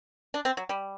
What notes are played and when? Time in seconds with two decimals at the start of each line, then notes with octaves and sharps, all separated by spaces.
0.34 D4
0.45 C4
0.57 F#3
0.69 G3